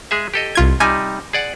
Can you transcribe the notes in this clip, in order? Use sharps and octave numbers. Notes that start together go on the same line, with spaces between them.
G#3 G#4 E5
G4 A4 D#5
C2 F4 G#6
C3 G3 D#4 G#5
G#4 D5 F#5